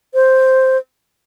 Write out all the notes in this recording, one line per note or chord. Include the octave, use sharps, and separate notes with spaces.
C5